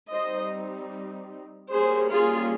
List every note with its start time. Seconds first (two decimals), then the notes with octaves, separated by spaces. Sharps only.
0.11 G3 C4 D#4 C5 D#5
1.71 G3 A#3 C#4 G#4 C5
2.10 F4 G#4